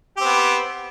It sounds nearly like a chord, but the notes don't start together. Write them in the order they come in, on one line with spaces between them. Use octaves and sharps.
G4 C4 B3